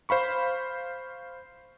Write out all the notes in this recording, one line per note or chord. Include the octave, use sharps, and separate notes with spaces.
C5 F5 B5 C#6